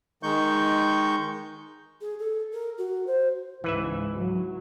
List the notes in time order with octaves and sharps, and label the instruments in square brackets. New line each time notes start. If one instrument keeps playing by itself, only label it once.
[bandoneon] D#3 G#3 D#4 C#6 G6
[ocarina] G#4
A4
A#4
F#4
C5
[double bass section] C#2 G#2 [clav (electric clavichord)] E3 B4 E5
[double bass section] F#3